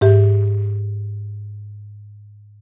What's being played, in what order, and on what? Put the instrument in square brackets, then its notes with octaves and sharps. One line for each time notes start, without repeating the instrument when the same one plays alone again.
[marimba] G#2 G4 E5